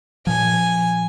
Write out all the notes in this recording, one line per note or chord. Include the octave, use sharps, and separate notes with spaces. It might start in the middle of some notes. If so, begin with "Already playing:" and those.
A#2 F3 G#5